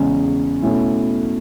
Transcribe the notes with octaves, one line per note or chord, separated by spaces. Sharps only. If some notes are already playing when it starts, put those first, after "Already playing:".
Already playing: E2 C#3 G#3 C#4
B2 A3 C#4 E4